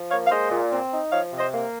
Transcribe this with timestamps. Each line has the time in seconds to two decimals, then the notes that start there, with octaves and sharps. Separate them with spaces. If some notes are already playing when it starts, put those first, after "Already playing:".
Already playing: F3
0.11 A#3 C#5 F5
0.26 F5
0.31 G#3 C5 D#5
0.51 A#2
0.72 C4
0.92 D#4
1.12 F3 C#5 F5
1.32 C3
1.39 C5 D#5
1.53 A#3